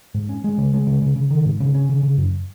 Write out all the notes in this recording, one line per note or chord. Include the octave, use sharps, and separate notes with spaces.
G#2
C#4
G#3
C#3
G#3
C#3
C#3
C#3
D#3
G#2
C#3
C#4
C#3
C#3
F#2